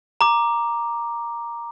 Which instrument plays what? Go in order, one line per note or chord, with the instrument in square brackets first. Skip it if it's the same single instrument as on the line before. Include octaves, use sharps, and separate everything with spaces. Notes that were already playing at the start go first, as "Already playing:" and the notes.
[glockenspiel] A#5 D6